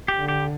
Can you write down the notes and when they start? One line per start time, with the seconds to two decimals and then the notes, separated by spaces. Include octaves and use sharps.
0.08 G4
0.18 D3
0.28 G4